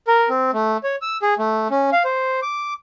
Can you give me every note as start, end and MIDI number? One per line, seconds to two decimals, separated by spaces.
0.08 0.29 70
0.29 0.51 60
0.53 0.77 57
0.84 0.96 73
1.02 1.17 88
1.22 1.34 68
1.39 1.68 57
1.70 1.90 61
1.93 2.03 77
2.05 2.40 72
2.42 2.74 86